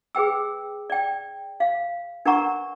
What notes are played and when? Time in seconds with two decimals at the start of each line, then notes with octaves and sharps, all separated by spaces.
0.15 G#4 B4 G5 E6
0.90 D5 G5
1.60 F5
2.26 D4 A#4 B4 F#5 A#5 C#6